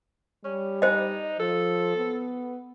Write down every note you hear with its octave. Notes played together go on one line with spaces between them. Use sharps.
G3 C#4
D#4 C5 D#5
F3 A4
B3